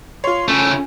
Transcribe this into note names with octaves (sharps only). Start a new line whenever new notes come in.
F4 C#5 C6
C#3 A3 C#4